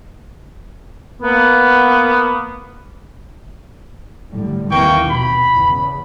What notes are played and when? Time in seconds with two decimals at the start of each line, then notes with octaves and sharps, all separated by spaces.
1.22 A#3 B3
4.32 A2 D3 G3
4.69 D#2 E3 A#3 C4 G5 C#6
5.09 B2 B5
5.53 E2 C#3